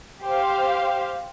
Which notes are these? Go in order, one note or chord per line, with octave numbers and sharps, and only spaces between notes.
G4 C5 F5